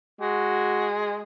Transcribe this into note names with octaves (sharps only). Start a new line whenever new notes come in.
G#3 F#4